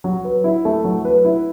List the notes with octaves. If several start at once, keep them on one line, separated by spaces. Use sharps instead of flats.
F#3
B4
E4
A3
F#3
B4
E4